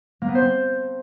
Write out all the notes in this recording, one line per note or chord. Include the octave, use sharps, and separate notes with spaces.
A#3
B3
C5
C4